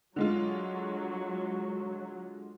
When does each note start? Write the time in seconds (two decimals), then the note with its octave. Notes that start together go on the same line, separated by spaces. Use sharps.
0.16 D3 F#3 G#3 F4